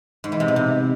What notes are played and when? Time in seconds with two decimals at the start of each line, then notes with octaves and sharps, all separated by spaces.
0.24 G#2
0.32 E3
0.40 C3
0.48 B2
0.56 C3